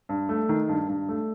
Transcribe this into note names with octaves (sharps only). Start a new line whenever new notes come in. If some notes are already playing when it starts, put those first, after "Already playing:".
G2
A3
D#3
G2
G2
A3